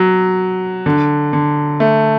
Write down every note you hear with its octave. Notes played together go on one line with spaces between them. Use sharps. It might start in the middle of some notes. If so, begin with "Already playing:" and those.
Already playing: F#3
D3
D3
A3